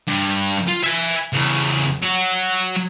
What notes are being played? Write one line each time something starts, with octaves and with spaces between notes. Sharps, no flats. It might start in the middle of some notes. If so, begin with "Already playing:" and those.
G2
F4
E5 G#5
E2 C#3
F#3 F#4